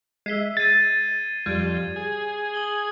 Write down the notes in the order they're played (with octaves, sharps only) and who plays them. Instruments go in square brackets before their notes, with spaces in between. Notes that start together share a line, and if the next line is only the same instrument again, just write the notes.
[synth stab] G#3 E5 [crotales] C7 G7
[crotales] G#6 D#7 [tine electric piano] A6
[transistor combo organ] F2 [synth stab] G3 [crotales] G#6
[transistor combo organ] G#4
[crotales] D#6 F#7 G7